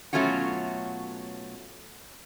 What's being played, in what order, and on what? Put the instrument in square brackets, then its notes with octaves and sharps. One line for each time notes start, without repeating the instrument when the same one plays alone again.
[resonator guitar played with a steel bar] B2 F#3 A3 C#4 F4 F#4